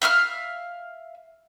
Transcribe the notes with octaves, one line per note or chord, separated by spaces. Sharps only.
E5 F5 E6 F6